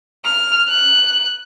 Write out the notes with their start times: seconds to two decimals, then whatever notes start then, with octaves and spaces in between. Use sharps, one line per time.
0.25 F6
0.68 F#6